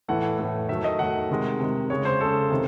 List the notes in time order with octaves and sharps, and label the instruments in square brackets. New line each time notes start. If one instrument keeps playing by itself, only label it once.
[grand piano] A2 E3 A3 F#5
A2 E3 A3
D#3 F#3 A3 E5
D#5
D#3 F#3 A3 F#5
C3 D#3 G#3
C3 D#3 G#3
C#3 G#3 C#5
C5
C#3 G#3 A4
C3 D#3